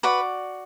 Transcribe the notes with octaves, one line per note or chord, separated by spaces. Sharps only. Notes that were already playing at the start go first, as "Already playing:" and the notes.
F#4 B4 D5 B5